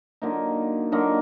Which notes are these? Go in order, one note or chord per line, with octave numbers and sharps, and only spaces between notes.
D3 F#3 A#3 D#4
D3 F#3 A#3 D#4